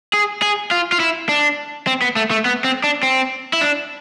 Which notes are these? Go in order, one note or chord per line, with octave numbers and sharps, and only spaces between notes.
G#4
G#4
F4
F4
E4
D4
C4
B3
A3
A3
B3
C4
D4
C4
E4
D4